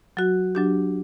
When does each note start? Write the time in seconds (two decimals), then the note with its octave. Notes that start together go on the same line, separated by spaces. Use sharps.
0.17 F#3 F#4
0.55 F#3 D4 G4